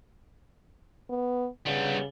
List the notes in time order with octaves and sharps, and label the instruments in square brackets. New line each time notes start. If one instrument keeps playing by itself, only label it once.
[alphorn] B3
[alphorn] C#3 [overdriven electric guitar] G3 B3